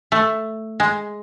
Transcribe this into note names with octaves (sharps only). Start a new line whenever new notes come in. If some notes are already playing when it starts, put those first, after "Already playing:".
A3
G#3